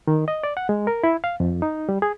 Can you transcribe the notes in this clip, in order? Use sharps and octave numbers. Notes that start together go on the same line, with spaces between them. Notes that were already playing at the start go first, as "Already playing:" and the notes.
D#3
D#5
D5
F#5
G#3
A#4
E4
F5
F2
D#4
G3
G#4